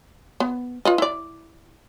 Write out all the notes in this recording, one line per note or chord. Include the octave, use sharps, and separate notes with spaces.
B3
F4 B4 D#5
E4 D5